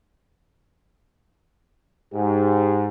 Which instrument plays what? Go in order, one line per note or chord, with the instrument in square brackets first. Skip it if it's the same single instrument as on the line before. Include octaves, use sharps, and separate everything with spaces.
[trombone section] G#2 [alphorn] G4